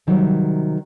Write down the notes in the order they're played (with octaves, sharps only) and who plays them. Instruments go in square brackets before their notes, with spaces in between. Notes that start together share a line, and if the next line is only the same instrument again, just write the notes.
[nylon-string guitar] C3 D#3 F#3 G3